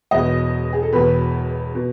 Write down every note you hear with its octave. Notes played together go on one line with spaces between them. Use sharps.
E1 E2 B2 D#5
G#4
A4
E1 E2 B2 B4
B2